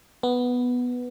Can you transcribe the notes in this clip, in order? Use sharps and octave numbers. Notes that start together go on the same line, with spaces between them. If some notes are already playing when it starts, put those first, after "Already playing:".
B3